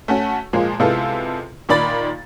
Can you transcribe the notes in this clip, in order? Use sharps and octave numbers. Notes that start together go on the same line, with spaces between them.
A3 C#4 F#4
A#2 F3 G#3 A#3
C3 G#3 B3 E4 F4 A4
A#2 D#3 D5 B5 A6